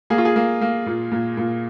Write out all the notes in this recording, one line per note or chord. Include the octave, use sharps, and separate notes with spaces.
A#3 G#4
F4
G#4
A#3
A#3
A#2
A#2
A#2